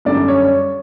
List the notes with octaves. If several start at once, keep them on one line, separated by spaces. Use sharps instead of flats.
F#2 D3 G3 D5
C#5